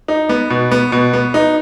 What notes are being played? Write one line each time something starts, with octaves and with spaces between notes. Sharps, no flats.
D#4
B3
B2
B3
B2
B3
D#4